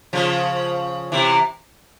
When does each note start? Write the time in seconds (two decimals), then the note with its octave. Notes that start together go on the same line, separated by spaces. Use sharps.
0.13 C#3 F3
1.12 C3 E3